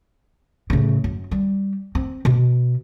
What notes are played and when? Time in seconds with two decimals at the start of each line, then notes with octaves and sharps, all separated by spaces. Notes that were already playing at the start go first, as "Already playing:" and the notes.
0.70 A2 C#3
1.04 F#2
1.31 G3
1.95 C4
2.25 B2